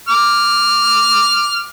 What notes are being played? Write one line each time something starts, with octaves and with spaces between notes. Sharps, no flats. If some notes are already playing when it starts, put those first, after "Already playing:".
D6 F6